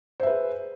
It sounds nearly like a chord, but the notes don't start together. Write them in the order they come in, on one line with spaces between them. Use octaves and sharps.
C5 E5 B4 G#4